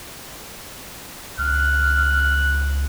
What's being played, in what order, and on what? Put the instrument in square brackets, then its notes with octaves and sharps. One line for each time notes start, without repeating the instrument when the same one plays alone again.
[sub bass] C#2 [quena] F6 [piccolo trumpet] F#6